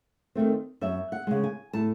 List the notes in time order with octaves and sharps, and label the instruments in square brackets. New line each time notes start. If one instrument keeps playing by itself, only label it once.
[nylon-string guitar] D#3 A3 C4
F#2 E5
F#5
C#3 G#3
G#5
A2 A5